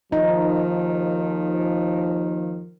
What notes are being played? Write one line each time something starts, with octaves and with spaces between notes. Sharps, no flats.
D#2 D#3 F3 D#4